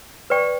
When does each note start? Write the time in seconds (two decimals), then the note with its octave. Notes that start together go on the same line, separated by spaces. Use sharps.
0.30 B4 D5 G5 C#6